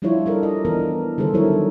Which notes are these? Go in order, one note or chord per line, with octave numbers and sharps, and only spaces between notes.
F3 G3 D4 E4 F4 C#5
D4 A4 A#4
D#5
E3 B3 D4 A#4
D3 D#3 G3 G#4 A4 C5
F#3 G3 E4 A#4 C#5